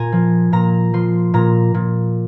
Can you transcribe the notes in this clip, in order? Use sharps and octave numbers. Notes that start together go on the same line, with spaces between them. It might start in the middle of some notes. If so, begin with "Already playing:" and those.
Already playing: A#2 G#5 A#5
F3
A#2 A#5
F3 C6
A#2 A#5
A#2